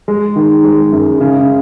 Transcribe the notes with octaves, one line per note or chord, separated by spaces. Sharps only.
G#3
D#3
G#3
F#2
C#3